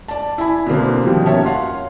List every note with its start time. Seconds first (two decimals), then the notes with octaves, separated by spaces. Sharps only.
0.08 D5 A5
0.38 E4 G#5 B5
0.67 B2 D3 A#3 C4
1.03 B2 D#3 F3 G3
1.26 A#3 C#4 C#5 E5 A5
1.45 F5 F#5 C6